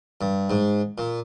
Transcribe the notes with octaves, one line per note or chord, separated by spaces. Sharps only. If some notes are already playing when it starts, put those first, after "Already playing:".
G2
G#2
A#2